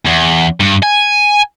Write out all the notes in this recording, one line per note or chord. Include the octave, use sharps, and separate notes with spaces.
E2
G2
G#5